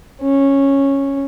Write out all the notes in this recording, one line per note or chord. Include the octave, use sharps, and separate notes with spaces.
C#4